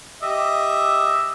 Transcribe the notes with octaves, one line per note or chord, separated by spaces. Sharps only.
G4 D#5 E5